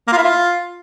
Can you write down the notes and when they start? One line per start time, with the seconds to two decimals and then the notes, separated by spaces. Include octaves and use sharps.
0.07 A#3
0.12 F4
0.17 E4
0.22 F4